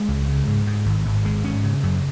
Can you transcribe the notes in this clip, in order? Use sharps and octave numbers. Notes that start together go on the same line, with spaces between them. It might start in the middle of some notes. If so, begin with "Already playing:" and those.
Already playing: G#3
C#2
C#3
G#2
G#2
G#1
G#1
G#1 G#3
G#2 C#4
C#3
F#2